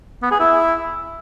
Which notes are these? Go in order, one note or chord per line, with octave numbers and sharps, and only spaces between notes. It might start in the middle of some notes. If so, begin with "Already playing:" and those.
B3
G#4
E4